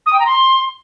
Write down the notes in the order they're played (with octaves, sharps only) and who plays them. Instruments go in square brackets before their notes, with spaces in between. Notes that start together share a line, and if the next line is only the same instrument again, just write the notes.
[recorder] D#6
G5
A#5
C6